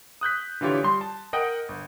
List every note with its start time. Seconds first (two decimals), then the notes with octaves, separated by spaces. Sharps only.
0.21 D#6 F#6 G6 B6
0.61 D3 E3 F4 G4 C#5
0.83 G3 C6
1.01 A5
1.33 A#4 D#5 F#5 G5
1.69 G1